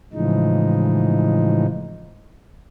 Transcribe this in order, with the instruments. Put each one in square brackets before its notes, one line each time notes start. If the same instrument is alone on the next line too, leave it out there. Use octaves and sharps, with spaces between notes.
[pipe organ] A2 C#3 E3 F3 G#3 D#4